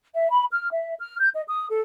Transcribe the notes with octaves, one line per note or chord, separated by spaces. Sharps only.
E5
B5
F6
E5
F6
G6
D#5
D#6
A4